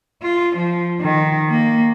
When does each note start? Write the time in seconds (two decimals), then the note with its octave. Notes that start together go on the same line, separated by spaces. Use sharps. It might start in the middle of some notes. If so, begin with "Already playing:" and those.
0.22 F4
0.56 F3
1.01 D#3
1.50 A#3